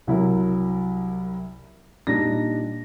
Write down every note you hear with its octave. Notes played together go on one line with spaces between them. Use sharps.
C2 F#3 E4 A#4
A#2 G3 D4 D#4 A#6